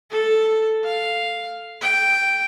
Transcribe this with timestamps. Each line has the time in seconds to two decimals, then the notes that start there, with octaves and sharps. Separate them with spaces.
0.10 A4
0.84 F5
1.81 G5